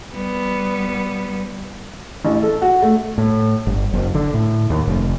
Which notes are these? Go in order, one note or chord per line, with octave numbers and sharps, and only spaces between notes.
G3 B3
A1
A4
F#4
A3
A2
G1
F#1
D3
A2
D#2
F1